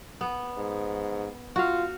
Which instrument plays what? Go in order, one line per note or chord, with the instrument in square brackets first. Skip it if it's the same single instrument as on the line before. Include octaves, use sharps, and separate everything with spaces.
[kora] B3
[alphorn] G#2
[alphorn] F4 [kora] F#4 F5